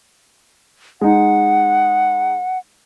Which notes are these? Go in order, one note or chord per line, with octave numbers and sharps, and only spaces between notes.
G#3 D#4 F#5